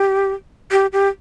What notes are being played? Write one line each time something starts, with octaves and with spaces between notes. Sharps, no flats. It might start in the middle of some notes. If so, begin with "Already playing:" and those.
Already playing: G4
G4
G4